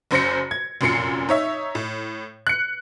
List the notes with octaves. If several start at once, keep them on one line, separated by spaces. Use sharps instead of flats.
F#1 F#2 C5 A#6 C#7
G#6
F1 F#2 A#2 C7 C#7
D#4 C#5 E5
A2
F#6 C#7